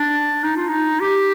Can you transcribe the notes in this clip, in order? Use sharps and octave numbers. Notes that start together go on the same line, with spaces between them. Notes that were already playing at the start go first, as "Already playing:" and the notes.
Already playing: D4
D#4
F4
D#4
G4